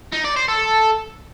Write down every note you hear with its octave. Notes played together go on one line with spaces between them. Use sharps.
D#4
D5
C5
A4